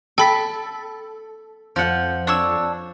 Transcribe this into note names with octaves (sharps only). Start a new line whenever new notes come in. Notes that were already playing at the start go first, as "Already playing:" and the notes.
A4 G5 B5 B6
F2 F3 F#5
D4 C#5 E6